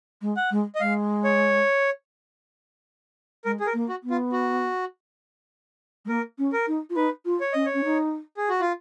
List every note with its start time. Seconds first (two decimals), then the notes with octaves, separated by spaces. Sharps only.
0.22 G#3
0.37 F#5
0.51 G#3
0.75 D#5
0.80 G#3 F5
1.24 C#5
3.45 G#3 A#4
3.60 G#4
3.67 A#4
3.73 A#3
3.89 F#4
4.03 B3
4.10 F4
4.32 F#4
6.05 G#3
6.09 A#3 A#4
6.38 C#4
6.53 A#4
6.67 D#4
6.90 F4
6.96 D#4 B4
7.25 F4
7.41 C#5
7.53 C#4 D#5
7.66 C#5
7.74 C#4
7.84 D#4
8.37 G#4
8.49 F#4
8.60 F4